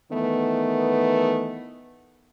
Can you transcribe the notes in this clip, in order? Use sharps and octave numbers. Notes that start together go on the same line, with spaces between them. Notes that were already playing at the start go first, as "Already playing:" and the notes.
D#3 E3 A3 B3